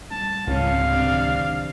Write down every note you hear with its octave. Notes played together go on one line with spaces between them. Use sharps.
G3 A3 C#4 A5
C#2 G#2 C#3 G3 C#4 F5
C3 C4 D4
A2 D#3 F#3